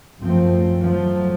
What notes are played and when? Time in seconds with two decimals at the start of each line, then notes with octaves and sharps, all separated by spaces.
0.22 F#2 F3 A3 C4
0.82 F3 F#3 A3